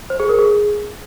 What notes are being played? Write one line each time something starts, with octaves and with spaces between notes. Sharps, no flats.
C5
G#4
A#4
G#4